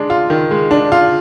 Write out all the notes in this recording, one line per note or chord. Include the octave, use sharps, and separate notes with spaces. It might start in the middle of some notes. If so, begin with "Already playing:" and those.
Already playing: G#3 D4
F4
D#3
G#3
D4
F4